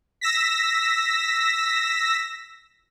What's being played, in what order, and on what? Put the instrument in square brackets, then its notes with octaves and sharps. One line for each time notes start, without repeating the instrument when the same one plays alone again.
[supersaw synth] E6 A#6 B6